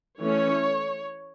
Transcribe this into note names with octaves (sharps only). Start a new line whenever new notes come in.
E3 A3 C#4 C#5